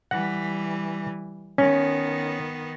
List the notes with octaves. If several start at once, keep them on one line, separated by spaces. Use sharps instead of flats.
E3 G3 F#5
D#3 B3 C#4